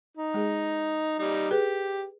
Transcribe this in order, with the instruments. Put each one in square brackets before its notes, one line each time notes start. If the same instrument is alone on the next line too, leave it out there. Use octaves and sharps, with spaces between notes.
[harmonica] D#4
[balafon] G#3 G#4
[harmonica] G3 D#4
[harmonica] G4 [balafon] G#4 B4